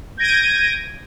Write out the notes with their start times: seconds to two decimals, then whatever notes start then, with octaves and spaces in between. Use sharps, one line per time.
0.17 G6 G#6 A#6 D7 D#7